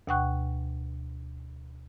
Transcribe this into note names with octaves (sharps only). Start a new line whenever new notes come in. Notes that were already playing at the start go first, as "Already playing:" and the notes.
D2 B2 F#5 G5 C#6 F#6